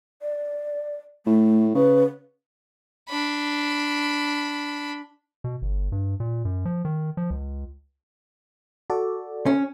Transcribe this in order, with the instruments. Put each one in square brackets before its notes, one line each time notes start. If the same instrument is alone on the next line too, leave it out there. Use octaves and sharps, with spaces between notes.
[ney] D5
[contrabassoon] A2 [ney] A3
[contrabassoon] C#3 [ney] B4
[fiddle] D4 B5
[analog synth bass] B2
G1
G2
A#2
F#2
F3
D#3
F3
C#2
[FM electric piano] F#4 A4 D5
[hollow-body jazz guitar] C#4